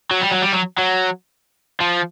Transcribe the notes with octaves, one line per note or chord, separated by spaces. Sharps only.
F#3
G3
F#3
G3
F#3
F#3
F3